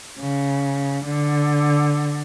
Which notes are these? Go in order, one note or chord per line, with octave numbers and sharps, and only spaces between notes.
C#3
D3